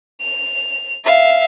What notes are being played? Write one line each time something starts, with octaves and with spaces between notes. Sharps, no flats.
F7
E5 F5